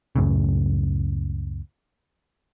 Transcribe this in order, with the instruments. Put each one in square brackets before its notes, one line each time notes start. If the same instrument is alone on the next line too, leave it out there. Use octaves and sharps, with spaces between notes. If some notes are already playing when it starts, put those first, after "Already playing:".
[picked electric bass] C#2 F#2 A2 C#3